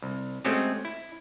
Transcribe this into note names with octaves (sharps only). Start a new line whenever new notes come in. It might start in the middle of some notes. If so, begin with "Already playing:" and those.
C2
G#3 A3 C4 C#4 F#4 G4
E4